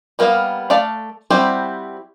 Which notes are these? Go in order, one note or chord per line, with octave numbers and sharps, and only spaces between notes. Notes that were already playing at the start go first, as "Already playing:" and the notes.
G3 A#3 B3 C5 F5
A3 D5 F5 A5
G3 C4 E4 F#4 G4